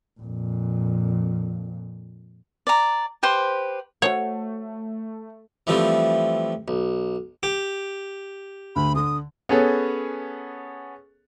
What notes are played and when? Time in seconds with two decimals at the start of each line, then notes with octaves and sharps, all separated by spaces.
0.20 F2 A#2
2.67 D5 A#5
3.23 G4 B4 C5 C6
4.02 A3 F#4 C5 C#5 F#5
5.67 E3 F3 G3 A3 C4
6.68 B1
7.43 G4
8.76 D2 B5
8.95 D3 D#6
9.49 B3 C#4 G#4 A4 C#5